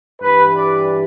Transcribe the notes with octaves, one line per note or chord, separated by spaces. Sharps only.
G2 E3 G3 B4
D5